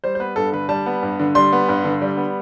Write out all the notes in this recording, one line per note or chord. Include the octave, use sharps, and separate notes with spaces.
G3 C5
C5
B3 B4
G2 A4
D3 B4
G3 A5
B3
G2
D3
G3 C6
B3
G2
D3
G3
B3